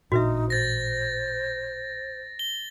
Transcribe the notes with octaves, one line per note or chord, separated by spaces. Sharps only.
A1 A#2 D4 D#4 F#4 B4 E5
C5 A6 A#6
G7